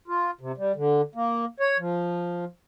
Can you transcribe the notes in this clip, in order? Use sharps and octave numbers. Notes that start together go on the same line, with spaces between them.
F4
C3
G3
D3
A#3
C#5
F3